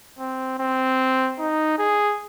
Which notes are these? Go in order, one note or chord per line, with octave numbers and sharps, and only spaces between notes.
C4
C4
D#4
G#4